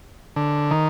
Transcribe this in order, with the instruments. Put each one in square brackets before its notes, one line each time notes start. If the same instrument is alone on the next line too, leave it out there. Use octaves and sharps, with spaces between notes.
[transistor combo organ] D3
D#3